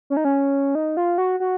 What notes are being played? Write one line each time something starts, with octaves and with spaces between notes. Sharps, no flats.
C#4
D#4
C#4
D#4
F4
F#4
F#4